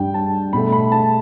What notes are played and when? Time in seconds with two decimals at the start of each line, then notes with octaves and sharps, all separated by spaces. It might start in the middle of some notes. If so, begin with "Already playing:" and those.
Already playing: G2 G3 G5
0.14 A5
0.53 B2 A3 B5
0.72 B5
0.92 A5